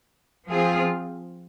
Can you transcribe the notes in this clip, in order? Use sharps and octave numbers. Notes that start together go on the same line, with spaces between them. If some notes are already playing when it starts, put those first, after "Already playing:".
F3 C4 F4 G#4